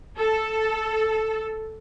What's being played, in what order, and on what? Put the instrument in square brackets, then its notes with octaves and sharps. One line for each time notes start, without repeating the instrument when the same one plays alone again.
[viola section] A4